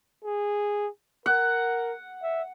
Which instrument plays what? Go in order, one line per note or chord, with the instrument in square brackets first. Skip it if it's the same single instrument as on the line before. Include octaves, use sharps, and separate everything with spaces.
[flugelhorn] G#4
[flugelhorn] A#4 [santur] F#5
[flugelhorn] E5